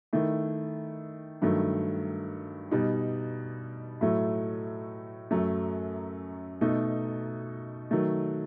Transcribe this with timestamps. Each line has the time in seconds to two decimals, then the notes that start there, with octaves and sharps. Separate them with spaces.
0.13 D#3 A3 E4
1.42 G2 D#3 F#3 A3
2.71 B2 G3 D#4
4.01 A2 F#3 A3
5.31 F#2 F#3 A3
6.61 B2 A3 D#4
7.91 D#3 F#3 A3